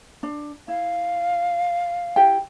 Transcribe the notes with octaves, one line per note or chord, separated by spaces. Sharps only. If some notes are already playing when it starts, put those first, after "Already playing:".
D4
E4 F5
E4 G4 G5